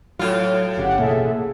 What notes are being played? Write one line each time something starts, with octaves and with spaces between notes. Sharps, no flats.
A2 F#3 F4
G1 C#3 G4 F#5
A1 B2 A#3 G#4 A4 E5